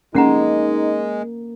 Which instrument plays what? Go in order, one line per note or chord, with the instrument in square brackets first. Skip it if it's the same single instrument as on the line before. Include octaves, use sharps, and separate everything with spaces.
[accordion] G#3 [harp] A#3 [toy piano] C#4 F#5 A#5 [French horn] D#4